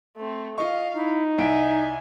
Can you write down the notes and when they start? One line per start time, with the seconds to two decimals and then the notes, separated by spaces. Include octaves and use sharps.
0.16 A3 C4
0.58 F4 D#5 F5 C#6
0.96 D#4 E4
1.38 C2 E4 E5 G#5 D7